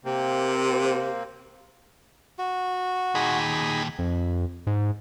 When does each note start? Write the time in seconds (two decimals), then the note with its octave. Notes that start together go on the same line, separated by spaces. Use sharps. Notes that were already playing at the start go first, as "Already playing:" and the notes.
0.05 C3 A#3 C4
2.39 F#4
3.15 D#2 A#2 D#4 G#4 B5
3.99 F2
4.67 G#2